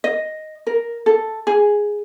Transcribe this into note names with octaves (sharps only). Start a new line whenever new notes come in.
D#5
A#4
A4
G#4